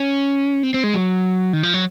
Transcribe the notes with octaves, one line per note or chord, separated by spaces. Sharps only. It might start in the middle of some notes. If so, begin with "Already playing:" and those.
Already playing: C#4
C4
C4
G#3
F#3
D#3
F3
F#3